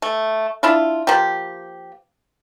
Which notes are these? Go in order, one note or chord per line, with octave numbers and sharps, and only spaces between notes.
A3
D4 E4 F4
F3 A#3 G4